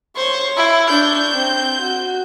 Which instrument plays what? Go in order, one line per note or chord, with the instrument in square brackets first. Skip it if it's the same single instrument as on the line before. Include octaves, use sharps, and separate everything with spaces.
[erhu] C5 [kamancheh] C#5 C#6
[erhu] E4
[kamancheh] D4 C#6 [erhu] G6
[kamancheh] C4
F#4